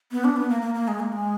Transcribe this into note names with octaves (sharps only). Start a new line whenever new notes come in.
B3
D4
B3
A#3
A#3
A#3
G#3
A#3
G#3